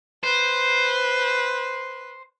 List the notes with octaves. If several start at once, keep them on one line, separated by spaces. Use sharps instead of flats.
B4 C5